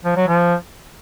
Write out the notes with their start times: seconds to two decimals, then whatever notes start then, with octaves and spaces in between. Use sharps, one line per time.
0.04 F3
0.16 F#3
0.28 F3